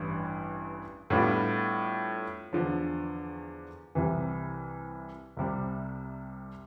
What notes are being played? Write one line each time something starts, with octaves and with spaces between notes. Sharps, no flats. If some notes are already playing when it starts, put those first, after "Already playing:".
Already playing: A1 G2 E3
A2 G3 B3 D4 F4
E2 D3 F3
C2 C3 E3
C2 C3 G3